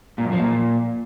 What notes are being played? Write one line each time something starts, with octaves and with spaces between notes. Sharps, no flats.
A#2
F#2
F3
A#2